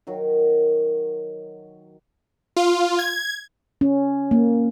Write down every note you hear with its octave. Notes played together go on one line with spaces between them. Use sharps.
D#3 F#3
F4
G#6
C#4
A#3